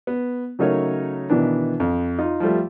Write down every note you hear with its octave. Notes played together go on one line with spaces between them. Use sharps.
B3
C#3 F#3 A3 D#4 A#4 C#5
B2 D#3 E3 B3 D4
F2
D#4 F4
F3 G3 A3